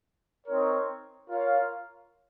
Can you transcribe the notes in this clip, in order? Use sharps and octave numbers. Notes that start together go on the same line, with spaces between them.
C4 D#4 A#4 C#5
F4 A#4 C#5 F5